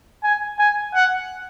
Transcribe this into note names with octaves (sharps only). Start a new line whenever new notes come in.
G#5
G#5
F#5